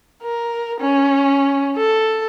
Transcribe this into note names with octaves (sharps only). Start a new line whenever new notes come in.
A#4
C#4
A4